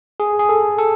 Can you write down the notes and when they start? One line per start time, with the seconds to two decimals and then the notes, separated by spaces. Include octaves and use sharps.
0.20 G#4
0.39 G#4
0.49 A4
0.78 A4